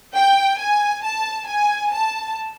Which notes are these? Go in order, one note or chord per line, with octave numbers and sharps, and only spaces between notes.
G5
G#5
A5
G#5
A5